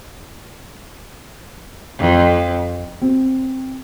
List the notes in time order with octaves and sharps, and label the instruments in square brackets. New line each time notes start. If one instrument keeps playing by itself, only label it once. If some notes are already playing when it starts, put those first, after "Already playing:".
[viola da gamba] F2
[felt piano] C4